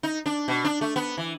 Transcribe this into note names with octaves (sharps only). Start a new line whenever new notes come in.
D#4
D4
B2
D4
A3
B3
E3